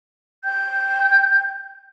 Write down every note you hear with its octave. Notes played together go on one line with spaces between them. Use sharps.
G5 G6